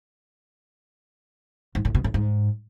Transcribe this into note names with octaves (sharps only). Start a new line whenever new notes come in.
G#2
A2
B2
A2
G#2